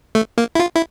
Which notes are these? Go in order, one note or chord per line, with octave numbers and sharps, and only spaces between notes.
A3
A#3
E4
F4
E4